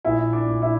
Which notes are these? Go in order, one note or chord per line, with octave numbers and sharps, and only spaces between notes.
A#1 E4
D4
A#1
E4